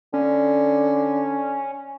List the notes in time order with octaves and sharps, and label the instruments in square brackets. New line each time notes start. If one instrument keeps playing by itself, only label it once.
[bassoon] D3 [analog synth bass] C#4